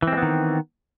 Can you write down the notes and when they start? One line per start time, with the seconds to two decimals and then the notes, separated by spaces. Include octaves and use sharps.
0.02 E3
0.07 C4
0.12 G#3
0.17 B3
0.22 D#3